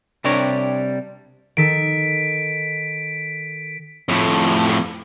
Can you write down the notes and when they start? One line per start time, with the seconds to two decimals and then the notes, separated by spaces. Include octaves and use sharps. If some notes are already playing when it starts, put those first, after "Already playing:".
0.24 C3 G3 D4 A#4 C#5
1.57 D#3 A4 B6 D7
4.09 F2 A2